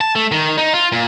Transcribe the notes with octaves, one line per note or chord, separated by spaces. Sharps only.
A5
A3
D#3
D#4
F4
A#2